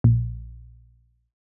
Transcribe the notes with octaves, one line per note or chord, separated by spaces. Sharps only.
A#1